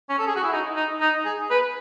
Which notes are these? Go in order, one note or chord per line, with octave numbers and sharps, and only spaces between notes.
C#4
A4
G#4
F#4
E4
D#4
D#4
D#4
G#4
B4